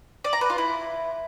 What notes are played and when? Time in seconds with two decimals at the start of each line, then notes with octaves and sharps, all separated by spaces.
0.24 D5
0.33 A#5
0.41 B4
0.50 F4
0.58 E4